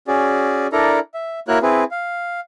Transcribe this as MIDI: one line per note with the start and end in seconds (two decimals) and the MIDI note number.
0.08 0.67 61
0.08 0.67 66
0.08 0.67 68
0.08 0.67 74
0.72 0.99 62
0.72 0.99 64
0.72 0.99 69
0.72 0.99 70
0.72 0.99 74
0.72 0.99 82
1.14 1.40 76
1.48 1.59 58
1.48 1.59 64
1.48 1.59 66
1.48 1.59 70
1.48 1.59 73
1.48 1.59 90
1.62 1.84 60
1.62 1.84 64
1.62 1.84 68
1.62 1.84 71
1.91 2.40 77